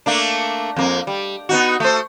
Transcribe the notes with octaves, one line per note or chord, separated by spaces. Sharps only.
A3 A#3 D4
F2 A#3
G3
B3 D#4 F#4
A3 C5